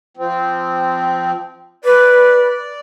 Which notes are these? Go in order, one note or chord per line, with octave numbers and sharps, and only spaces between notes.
F3 C4
B4 D5